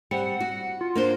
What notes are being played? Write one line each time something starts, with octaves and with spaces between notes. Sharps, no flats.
G3 C4 F#5
F#4
F4
A#3 D4 C5